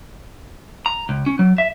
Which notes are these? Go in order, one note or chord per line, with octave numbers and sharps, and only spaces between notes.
A#5
C#2
C#4
F#3
E5